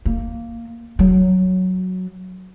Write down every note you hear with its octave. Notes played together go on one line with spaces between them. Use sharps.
A#3
F#3